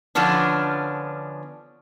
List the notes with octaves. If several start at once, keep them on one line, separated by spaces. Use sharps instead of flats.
D3 F3 B3 C#4 D4